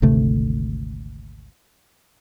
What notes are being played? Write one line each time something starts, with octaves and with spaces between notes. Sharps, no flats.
G#1 D2 C3 A3